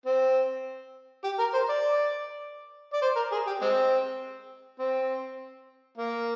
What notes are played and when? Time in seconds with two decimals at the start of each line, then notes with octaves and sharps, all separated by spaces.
0.06 C4
1.24 G4
1.39 A#4
1.54 C5
1.69 D5
2.93 D5
3.02 C5
3.16 A#4
3.32 G#4
3.47 G4
3.61 G#3 C4
4.79 C4
5.97 A#3